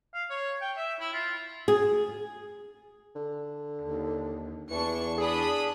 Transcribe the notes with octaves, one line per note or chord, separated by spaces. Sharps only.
F5
C#5
G5
E5
E4
F4
G#4
D3
D#2
E2 E3 D4 C#6 C#7
D4 G#4 B5 D#6